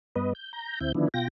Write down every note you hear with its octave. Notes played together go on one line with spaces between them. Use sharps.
G2 B3 B4 D#5
G6
A#5 G6
D2 C4 E4 G6
D3 D#3 F3 B3 D4 E4
B2 F4 G5 A#6